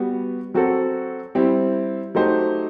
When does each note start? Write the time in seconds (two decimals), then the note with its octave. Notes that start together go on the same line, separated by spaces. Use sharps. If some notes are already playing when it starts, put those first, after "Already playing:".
Already playing: G3 B3 F#4
0.54 F#3 C4 F#4 A4
1.35 G3 C4 E4
2.15 F#3 A3 D#4 G4 C5